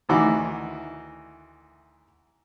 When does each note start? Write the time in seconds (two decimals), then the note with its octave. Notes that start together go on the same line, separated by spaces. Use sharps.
0.09 D2 D#3 E3 F#4 D6